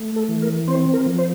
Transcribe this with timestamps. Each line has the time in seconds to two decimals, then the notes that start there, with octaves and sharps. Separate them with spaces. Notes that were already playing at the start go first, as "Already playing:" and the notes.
Already playing: A3
0.16 A4
0.29 E3
0.42 A#4
0.68 C4 C5
0.93 A#4
1.06 F3
1.18 C5